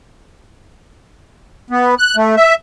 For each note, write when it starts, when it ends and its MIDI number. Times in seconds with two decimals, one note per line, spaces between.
1.70 1.95 59
1.98 2.16 90
2.17 2.36 57
2.37 2.55 76